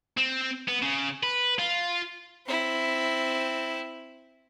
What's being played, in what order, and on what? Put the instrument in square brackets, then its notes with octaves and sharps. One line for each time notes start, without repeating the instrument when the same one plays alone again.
[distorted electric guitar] C4
B3
C#3
B4
F4
[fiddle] C4 E4